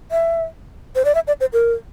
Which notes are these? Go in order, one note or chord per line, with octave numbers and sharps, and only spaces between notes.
E5
C5
D5
E5
D5
C5
A#4